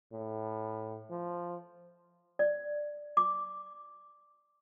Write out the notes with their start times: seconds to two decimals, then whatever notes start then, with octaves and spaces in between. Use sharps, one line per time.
0.13 A2
1.10 F3
2.39 D5
3.17 D6